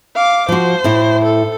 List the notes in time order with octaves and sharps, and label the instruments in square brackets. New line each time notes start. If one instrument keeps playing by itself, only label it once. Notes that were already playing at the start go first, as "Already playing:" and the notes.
[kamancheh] F5 D6
[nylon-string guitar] F3 F#4 [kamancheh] C5
[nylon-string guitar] A2 E4
[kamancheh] A4